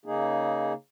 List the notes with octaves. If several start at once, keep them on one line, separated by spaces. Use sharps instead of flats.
C#3 A#3 D#4 G#4